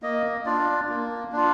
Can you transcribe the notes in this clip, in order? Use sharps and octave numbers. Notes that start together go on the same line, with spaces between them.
A#3 D#5
D4 F4 D5
A#3
D4 F4